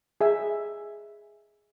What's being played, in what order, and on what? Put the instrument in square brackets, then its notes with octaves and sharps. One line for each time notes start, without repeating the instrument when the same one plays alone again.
[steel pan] G#4 E5